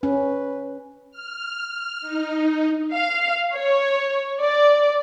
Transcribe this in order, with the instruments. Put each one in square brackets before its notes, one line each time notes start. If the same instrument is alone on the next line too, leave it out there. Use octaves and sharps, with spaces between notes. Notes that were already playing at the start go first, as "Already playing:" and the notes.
[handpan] C#4 [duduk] B4
[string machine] F6
D#4
[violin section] F5
C#5
D5